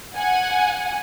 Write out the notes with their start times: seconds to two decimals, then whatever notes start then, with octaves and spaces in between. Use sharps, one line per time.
0.16 F#5 G#5